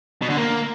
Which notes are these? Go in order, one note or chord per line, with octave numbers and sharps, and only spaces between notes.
B2
D3
A#3